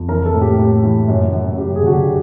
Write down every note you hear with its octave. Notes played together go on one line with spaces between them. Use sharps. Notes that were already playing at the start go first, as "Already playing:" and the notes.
Already playing: F2
E3 A#4
A4
A2
G4
A2
E3
F#2
F#2
F#2 G4
G#4
D3 F#4
G4